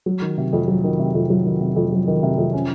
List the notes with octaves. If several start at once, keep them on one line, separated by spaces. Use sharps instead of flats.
F#3
D#3
C3
F2
F#3
D#3
C3
F2
F#3
D#3
C3
F2
F#3
D#3
C3
F2
C#4